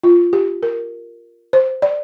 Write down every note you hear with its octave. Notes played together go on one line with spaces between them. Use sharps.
F4
G4
A#4
C5
D5